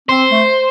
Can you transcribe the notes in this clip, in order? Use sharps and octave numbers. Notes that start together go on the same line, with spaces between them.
C4 C5
A3